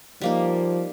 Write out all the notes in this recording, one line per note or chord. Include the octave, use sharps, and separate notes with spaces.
F3 G3 A#3 D#4